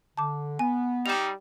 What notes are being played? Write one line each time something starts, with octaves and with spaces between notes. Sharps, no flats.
D3 A5 D6
B3 G#5
G3 D#4 E7 F7